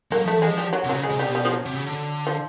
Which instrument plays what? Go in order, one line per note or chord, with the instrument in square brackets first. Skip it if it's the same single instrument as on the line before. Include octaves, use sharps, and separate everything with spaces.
[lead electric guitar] F#3 [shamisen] A#3
[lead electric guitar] F3 [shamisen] A3
[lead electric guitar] E3 [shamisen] G#3
[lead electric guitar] F3
[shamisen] G3
F#3
[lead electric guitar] C3
[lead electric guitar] C#3 [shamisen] F#3
[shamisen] G#3
[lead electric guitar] C#3
C3
[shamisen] G3
[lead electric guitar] B2
[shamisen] G3
F3
F#3
[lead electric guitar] C3
C#3
D3
[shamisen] F3